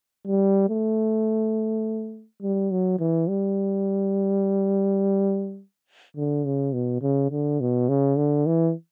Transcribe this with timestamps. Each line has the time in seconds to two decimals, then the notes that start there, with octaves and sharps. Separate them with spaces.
0.27 G3
0.69 A3
2.42 G3
2.71 F#3
2.99 E3
3.29 G3
6.17 D3
6.45 C#3
6.73 B2
7.02 C#3
7.31 D3
7.60 B2
7.89 C#3
8.17 D3
8.46 E3